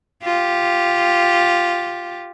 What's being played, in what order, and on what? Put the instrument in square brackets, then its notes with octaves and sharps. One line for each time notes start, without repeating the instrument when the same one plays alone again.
[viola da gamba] F4 G4